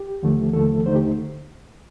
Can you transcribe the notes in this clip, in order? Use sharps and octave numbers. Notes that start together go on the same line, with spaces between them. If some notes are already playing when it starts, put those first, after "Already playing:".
Already playing: G4
D#2 D3 F3 A3
D#2 D3 F3 A3 A4
D#2 D3 A3 D#4 C5
G4